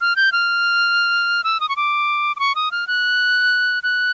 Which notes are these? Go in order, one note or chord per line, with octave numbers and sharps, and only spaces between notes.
F6
G6
F6
E6
D#6
C#6
D6
D6
C#6
D#6
F6
F#6
F#6